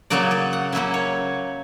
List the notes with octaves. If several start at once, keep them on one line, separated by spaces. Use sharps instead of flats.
C#3 F#3 A#3 C#4 D5
D5
F#5
C#3 F#3 A#3 C#4 E5
C#5